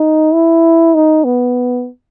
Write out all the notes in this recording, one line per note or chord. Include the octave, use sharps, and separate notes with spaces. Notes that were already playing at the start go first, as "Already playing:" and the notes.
Already playing: D#4
E4
D#4
B3